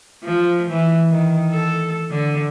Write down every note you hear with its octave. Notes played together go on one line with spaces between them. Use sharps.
F3
E3
D#3
A4
D3